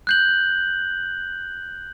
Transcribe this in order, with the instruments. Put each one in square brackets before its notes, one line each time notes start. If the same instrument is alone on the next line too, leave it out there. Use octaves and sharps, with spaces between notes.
[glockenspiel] F#6 G6 F#7